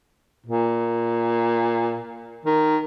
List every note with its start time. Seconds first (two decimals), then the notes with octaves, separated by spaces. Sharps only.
0.46 A#2
2.45 D#3